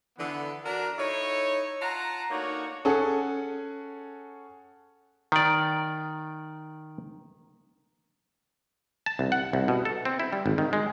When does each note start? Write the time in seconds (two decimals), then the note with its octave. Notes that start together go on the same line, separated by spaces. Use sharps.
0.18 D3 E3 B3
0.64 D4 F#4 A#4
0.98 D#4 E4 A4 C#5
1.81 F4 F#5 A5 A#5
2.30 A3 A#3 D4 D#4 F#4 C#5
2.85 C#4 G#4 A4 F#5
5.32 D#3 D5
9.06 A5
9.19 C2
9.32 F#5
9.53 C2
9.68 B2
9.85 A4
10.05 C4
10.20 E4
10.33 G3
10.46 G#1
10.58 D#3
10.73 G#3